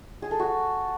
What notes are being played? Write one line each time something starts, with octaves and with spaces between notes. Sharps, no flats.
G#4
A4
F#4